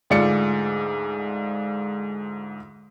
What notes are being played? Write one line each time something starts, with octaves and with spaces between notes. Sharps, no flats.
D2 G#2 F4 D5 C#7